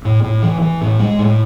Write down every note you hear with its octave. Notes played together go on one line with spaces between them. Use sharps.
A2
A2
E3
E3
A2
G#3
A2